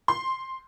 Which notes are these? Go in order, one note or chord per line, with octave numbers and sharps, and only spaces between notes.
C6